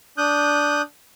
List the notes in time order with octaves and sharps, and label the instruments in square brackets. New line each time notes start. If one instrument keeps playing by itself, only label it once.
[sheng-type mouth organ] D4 D#6 F#6 G6